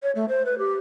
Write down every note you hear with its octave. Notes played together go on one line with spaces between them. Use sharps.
C#5
A3
C5
B4
G4